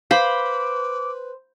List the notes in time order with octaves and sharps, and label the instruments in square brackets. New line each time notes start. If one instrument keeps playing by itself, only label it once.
[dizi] B4 [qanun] C5 B5 [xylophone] F5 [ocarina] D6